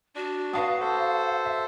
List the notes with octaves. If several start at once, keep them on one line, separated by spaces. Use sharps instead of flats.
D4 F#4
F#4 B4 F5 A5 D#6
A4 C5
E5